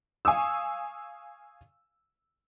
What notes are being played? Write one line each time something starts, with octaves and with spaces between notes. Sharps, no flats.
F5 G#5 C#6 D#6 E6